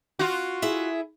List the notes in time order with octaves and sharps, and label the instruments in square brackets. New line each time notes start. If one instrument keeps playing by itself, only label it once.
[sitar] F4 F#4
[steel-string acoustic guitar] E4 G#4 E5